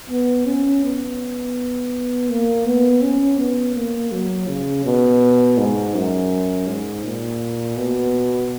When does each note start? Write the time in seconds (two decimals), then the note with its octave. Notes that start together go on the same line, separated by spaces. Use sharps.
0.10 B3
0.46 C#4
0.83 B3
2.29 A#3
2.66 B3
3.02 C#4
3.38 B3
3.75 A#3
4.12 F#3
4.48 C#3
4.85 B2
5.58 G#2
5.95 F#2
6.67 G#2
7.04 A#2
7.77 B2